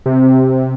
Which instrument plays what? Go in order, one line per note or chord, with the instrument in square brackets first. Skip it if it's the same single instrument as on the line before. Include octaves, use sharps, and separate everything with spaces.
[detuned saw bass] C3